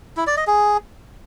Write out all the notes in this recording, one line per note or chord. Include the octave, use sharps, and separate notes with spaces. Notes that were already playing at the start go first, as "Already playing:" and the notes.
E4
D5
D#5
G#4